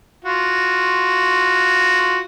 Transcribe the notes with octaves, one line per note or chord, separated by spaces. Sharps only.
F4 F#4